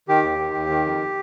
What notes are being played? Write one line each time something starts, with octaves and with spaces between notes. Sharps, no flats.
D#3 G4
D#2
D#3
D#2
D#3
F2